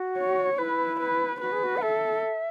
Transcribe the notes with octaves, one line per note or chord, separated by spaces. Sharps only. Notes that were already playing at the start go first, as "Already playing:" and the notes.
Already playing: F#4
C#5
E4 B4
B4
F#4 B4
G#4
F#4
F#5
A4 E5